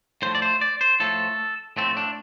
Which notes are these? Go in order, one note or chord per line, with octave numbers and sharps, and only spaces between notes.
A2 F3 A3 C5
D5
C5
D5
C5
A2 F3 A3 A4
A2 F3 A3 C4
D4